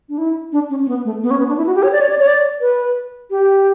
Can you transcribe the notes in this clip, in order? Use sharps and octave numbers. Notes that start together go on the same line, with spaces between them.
D4
E4
D4
C#4
C#4
B3
A3
B3
C#4
B3
D4
E4
F#4
G4
C#5
D5
C#5
D5
C#5
D5
B4
G4